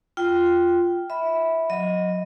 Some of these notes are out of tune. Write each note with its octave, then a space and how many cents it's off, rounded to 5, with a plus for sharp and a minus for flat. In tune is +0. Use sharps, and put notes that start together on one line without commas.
F4 +0 G5 -5
E5 -20 B5 +0
F#3 -25 D#5 +0